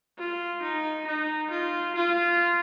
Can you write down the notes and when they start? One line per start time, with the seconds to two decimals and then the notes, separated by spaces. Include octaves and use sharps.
0.18 F4
0.63 D#4
1.07 D#4
1.51 F4
1.95 F4